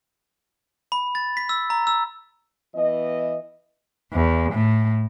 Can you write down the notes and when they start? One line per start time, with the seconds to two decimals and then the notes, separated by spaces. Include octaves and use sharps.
0.92 B5
1.15 A6
1.37 B6
1.49 E6
1.70 A#5
1.87 E6
2.75 E3 B3 D#5
4.13 E2
4.52 A2